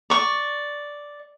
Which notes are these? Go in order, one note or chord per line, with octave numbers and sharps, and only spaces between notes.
D5 C#6